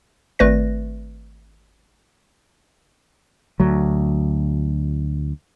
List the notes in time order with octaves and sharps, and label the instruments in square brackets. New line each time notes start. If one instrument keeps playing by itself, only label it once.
[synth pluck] G#1 A3 B4 D5 A#6
[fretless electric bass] D2 F#3